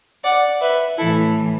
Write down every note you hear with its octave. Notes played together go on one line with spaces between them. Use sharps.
D5 F#5
B4 E5
A2 E3 E4 A4